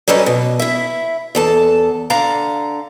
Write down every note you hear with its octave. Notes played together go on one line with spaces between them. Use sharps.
F#3 G3 C#4 A4 B4 D#5
B2
E4 E5
E2 A4 A5
D3 D5 F5 A#5